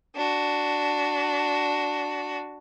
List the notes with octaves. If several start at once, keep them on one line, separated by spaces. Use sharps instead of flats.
D4 F#4